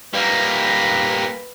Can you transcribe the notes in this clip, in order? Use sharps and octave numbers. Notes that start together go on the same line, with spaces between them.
G3 A#3 B4